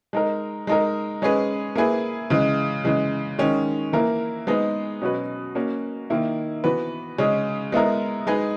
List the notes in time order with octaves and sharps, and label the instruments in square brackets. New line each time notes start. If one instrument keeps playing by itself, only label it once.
[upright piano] G#3 D#4 A#4
G#3 D#4 A#4
G#3 C#4 G#4 B4
A#3 E4 G#4 B4
C#3 E3 G#3
C#3 E3 G#3
D#3 G#3 C#4
E3 A#3 E4 A#4
G#3 B3 D#4 G#4 B4
B2 F#3 C#4 F#4 B4
A#3 C#4 F#4
D#3 A#3 E4
E3 B3 F#4 B4
C#3 G#3 C#4
G#3 B3 E4 A#4
G#3 D#4 G#4 B4